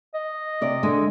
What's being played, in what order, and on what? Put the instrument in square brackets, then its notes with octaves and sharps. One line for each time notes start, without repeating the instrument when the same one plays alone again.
[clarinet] D#5
[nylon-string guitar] C3 D5
D3 G#3